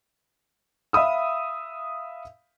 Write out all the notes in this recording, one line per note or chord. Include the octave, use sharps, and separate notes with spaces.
E5 F5 B5 D#6 E6